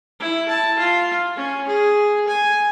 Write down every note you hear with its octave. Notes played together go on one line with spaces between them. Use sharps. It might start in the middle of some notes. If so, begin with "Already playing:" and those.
E4
A5
F4
C#4
G#4
G#5